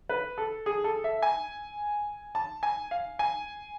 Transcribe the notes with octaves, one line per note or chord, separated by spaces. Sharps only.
B4
A4
G#4
A4
E5
G#5
A5
G#5
F5
G#5